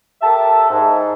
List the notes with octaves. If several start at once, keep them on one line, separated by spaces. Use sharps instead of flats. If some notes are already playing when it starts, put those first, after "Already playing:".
G4 A4 A#4 E5 A5
G#2